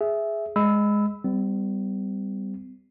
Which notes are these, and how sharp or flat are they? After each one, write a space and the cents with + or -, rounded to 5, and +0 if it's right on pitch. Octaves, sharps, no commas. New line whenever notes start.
G#4 +5 E5 +0
G#3 +0 B5 +20 E6 -15
G3 +0 C4 -45